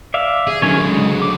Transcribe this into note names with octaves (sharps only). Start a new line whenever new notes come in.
D5 E5 F5
G#4
D3 D#3 F#3 C#4 C#5
C#3 G#3
D6